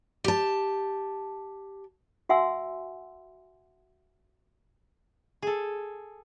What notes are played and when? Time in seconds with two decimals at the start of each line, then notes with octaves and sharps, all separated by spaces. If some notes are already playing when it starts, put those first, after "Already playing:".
0.24 G4 A5
2.29 F#4 E5 F#5 G#5 C6 E6
5.42 G#4 A4